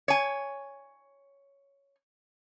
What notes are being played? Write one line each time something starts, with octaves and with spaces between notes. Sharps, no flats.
C#5 G#5